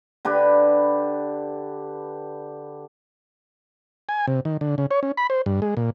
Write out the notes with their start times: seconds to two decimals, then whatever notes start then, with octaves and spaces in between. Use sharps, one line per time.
0.25 D3 G4 B4 B5
4.09 G#5
4.27 C3
4.45 D#3
4.61 D3
4.78 C#3
4.91 C#5
5.03 C#4
5.17 B5
5.30 C5
5.46 G2
5.62 G#3
5.77 A#2